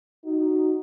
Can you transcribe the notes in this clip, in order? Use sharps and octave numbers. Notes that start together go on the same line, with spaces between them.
D#4 F#4